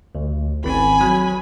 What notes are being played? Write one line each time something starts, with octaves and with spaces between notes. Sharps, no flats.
D2
G#1 C4 G#5 B5
F#3